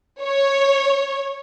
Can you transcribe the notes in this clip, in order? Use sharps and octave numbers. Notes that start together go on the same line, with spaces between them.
C#5